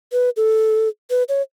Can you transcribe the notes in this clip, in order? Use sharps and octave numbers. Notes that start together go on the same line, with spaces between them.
B4
A4
B4
C#5